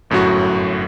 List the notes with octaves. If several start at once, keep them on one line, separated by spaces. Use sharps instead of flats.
G1 F#2 A2 F#3 F#4